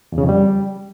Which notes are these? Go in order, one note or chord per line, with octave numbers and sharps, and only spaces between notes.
E2
C#3
F2
G3